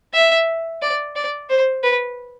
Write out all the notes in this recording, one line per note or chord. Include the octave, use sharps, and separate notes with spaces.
E5
D5
D5
C5
B4